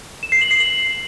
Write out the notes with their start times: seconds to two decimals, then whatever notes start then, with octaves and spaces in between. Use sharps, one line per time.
0.23 E7
0.32 C7
0.41 F#7
0.51 C7
0.60 F#7